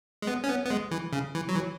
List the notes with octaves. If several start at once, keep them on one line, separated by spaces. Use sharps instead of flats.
G#3
B3
C#4
B3
B3
G#3
E3
C#3
E3
F#3
E3